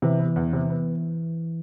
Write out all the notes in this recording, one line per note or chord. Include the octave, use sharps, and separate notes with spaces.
C3 E3
B3
E2
C3
B3